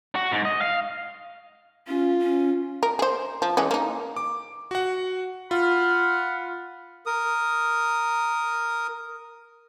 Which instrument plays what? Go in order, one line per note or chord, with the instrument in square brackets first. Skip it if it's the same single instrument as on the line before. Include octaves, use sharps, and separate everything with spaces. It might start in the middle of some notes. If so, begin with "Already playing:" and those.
[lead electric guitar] F#4
G#2
D#5
F5
[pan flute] C#4 [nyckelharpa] F4
[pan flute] C#4
[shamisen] A#4
G#4 C5
F3
E3 G#3 C#4
A#3 D#4
[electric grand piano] D6
F#4 F#5
[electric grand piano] F4 [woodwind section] F#5 B5 F6
[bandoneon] A#4 D#6